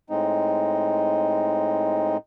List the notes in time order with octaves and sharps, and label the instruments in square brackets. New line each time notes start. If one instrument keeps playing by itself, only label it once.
[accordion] A2 G#3 C4 D#4